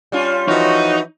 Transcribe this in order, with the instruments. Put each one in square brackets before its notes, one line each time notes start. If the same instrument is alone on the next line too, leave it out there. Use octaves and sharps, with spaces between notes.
[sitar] G3 C#4 F4
[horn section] E3 F3 F#4 [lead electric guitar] D#4 [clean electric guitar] C#5